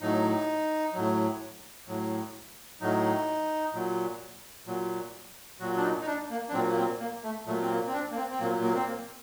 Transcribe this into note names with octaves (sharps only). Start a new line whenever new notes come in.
A2 F#3 D#4
A2 F#3
A2 F#3
A2 F#3 D#4
A#2 F#3
A#2 F#3
A#2 F#3 F#4
D4
D#4
D#4
D4
A#3
D4
A#2 F#3 C4
A#3
C4
A#3
A3
A#2 F#3 A3
C4
A#3
C4
D4
A#3
C4
C4
A#2 F#3 A#3
A#3
C4
A#3